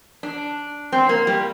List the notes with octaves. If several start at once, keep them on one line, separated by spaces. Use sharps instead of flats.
D4
C4
A#3
G3